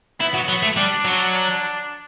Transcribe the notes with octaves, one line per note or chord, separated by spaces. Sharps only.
B3 E4
F#3
F#3
A3
G3 D4
F#3
D4